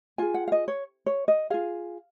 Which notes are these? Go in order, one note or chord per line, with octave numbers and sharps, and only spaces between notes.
F4 G#4 G#5
F#5
F5
D#5
C#5
C#5
D#5
F4 G#4 F5